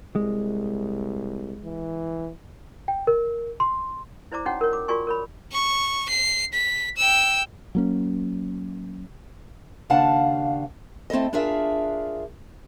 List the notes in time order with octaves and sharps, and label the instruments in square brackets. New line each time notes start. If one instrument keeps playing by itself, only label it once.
[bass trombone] C2 [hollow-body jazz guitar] G#3
[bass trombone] E3
[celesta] G5
A#4
C6
[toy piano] E4 C5 D5 A#5 D6
C#4 D#4 F#4 C#5 F#5 G5
A#4 C#5
D6
F4 F#4 A#4 D5 G#5 C#6
A#4 C#5 B5
[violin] C#6
C7
B6
G5 E6
[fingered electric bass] F#3 A#3 C#4
[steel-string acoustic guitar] D#2 C#3 D4 F5 F#5 A5
A3 C4 E4 A4 D#5
D4 F4 G#4 A#4 E5